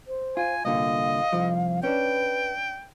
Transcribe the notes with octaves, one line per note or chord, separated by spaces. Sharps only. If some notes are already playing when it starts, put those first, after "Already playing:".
C5
F4 G#5
C2 A#2 D3 D#5 F5
C2 F2 F3
C#4 D4 B4 G5